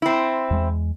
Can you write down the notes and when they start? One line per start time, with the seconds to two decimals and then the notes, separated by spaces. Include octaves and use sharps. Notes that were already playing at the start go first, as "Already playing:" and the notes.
0.02 C4 E4
0.50 E2 G#3